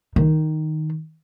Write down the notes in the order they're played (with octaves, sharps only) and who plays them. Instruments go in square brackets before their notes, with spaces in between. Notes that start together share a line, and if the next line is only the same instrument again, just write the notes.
[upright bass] D#3